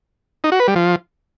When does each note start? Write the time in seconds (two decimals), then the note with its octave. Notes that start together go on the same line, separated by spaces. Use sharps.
0.44 D#4
0.52 F#4
0.60 B4
0.68 G3
0.76 F3